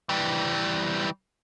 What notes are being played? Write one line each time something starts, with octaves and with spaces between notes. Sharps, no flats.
E3 G3